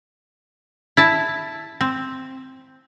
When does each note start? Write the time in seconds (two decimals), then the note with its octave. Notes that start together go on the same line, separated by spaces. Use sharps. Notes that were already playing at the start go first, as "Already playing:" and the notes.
0.97 E4 A5
1.81 C4